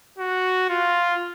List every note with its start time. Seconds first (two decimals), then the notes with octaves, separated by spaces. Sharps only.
0.19 F#4
0.69 F4